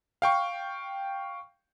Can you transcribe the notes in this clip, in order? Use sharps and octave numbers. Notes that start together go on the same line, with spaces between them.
F5 G5 C#6